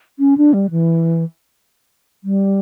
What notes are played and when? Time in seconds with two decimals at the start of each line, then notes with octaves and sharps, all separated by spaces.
0.19 C#4
0.37 D4
0.53 G3
0.71 E3
2.24 G3